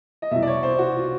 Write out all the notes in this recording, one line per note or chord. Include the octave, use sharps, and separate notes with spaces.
D#5
C2 B2 E5
D5
C#5
C5
F#4
F4